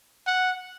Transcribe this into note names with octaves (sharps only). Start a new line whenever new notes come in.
F#5